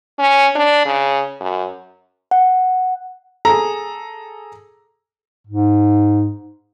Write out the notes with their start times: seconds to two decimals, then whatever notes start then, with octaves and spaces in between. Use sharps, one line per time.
0.19 C#4
0.56 D4
0.86 C#3
1.40 F#2
2.31 F#5
3.45 G#4 A4 A#5
5.47 G#2